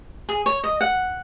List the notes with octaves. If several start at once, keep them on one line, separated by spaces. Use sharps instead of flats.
G#4
C#5
D#5
F#5